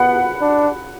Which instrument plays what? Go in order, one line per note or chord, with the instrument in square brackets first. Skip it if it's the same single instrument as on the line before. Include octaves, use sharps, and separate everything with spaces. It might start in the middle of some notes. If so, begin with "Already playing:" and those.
Already playing: [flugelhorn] B3 [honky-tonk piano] F#5 B5
[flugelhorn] D4